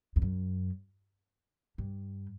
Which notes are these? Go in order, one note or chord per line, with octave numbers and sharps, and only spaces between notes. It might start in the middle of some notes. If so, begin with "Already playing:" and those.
E2
F#2
G2